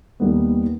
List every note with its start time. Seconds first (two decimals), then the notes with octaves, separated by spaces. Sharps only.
0.20 D#2 D#3 G3 B3